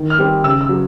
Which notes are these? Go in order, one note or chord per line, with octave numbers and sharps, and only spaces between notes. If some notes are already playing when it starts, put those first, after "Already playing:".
Already playing: D#3
F6
G3 C4
C#3 E6
E6
F#3